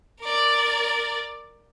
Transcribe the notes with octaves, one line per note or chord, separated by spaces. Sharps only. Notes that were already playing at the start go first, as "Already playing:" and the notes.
A#4 D5